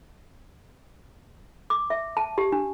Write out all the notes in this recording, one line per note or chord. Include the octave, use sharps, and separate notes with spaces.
D6
E5
A5
G4
D4